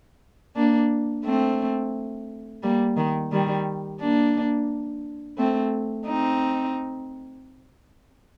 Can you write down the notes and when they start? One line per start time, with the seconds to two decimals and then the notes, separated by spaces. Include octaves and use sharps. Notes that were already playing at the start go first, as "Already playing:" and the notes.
0.56 A#3 D4
1.25 A3 C4
2.63 G3 A#3
2.97 D#3
3.31 D#3 G3
4.00 A#3 D4
5.38 A3 C4
6.07 C4 D#4